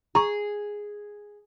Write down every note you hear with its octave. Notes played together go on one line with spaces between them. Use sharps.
G#4 A#5 C#6